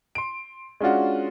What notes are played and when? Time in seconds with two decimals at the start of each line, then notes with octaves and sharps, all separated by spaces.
0.15 C6 D7
0.80 G#3 C#4 D4 F4 F#4